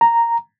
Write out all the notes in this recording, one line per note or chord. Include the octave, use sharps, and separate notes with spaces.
A#5